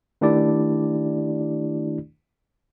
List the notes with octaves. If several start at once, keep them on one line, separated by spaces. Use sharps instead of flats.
D#3 A3 D4 E4 G4 D5